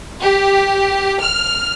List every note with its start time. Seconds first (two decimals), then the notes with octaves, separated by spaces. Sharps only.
0.21 G4
1.22 F6